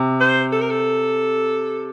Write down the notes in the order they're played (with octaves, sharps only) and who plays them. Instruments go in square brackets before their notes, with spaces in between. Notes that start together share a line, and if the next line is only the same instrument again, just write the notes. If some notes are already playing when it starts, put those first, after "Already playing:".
Already playing: [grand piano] C3
[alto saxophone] C5
A4
A#4
A4